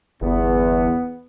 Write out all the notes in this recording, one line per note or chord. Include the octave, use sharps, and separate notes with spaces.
G1 E2 B3